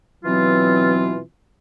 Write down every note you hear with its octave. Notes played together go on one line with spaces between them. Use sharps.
B2 E3 F#3 C4 F4